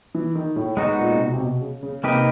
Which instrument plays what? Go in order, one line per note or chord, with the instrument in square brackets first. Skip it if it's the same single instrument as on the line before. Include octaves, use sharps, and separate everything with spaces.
[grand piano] E3
D#3
A2
[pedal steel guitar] G#3 B3 D#4 F#4
[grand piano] A#2
C3
B2
C3
B2
C#3
C#3
[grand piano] C3 [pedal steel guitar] A#3 D#4 G4 B4 D#5